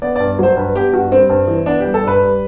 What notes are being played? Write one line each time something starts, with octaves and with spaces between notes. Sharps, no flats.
B3 D5
G2 D5
F#3 C5
G2 B4
B3 G4
G2 F#4
G3 C4
G2
E3
B3 D4
G3 G4
A4
G2 B4
G3